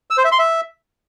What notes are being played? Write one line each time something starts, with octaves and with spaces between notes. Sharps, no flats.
E6
C5
E5
C6
E5